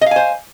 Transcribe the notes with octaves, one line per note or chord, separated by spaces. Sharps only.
C5 D#5 F5 G#5